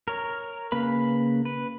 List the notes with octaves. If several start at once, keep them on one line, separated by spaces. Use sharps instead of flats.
A#4 C#5
C#3 A#3 B4 B5
B4